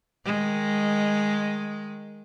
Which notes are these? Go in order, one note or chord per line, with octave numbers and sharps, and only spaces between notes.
D#3 G#3